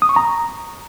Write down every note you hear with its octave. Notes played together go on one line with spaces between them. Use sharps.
D#6
C#6
A#5